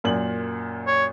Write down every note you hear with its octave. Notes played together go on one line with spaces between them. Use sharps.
F#2 A#2 F#7
C#5